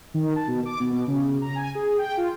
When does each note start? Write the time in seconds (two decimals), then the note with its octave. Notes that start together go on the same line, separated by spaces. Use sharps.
0.14 D#3
0.36 A5
0.48 B2
0.65 D6
0.80 B2
0.92 B2
1.07 C#3
1.41 A#5
1.55 G#5
1.75 G#4
1.98 G5
2.17 F4